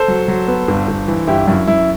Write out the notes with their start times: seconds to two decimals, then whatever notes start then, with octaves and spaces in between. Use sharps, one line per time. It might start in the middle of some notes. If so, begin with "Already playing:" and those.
Already playing: A4 C5
0.08 F#3
0.28 F#3
0.48 B3
0.68 G1
0.88 G1
1.08 E3
1.27 G1 E4 G4
1.47 F#2 E4
1.67 F#2 E4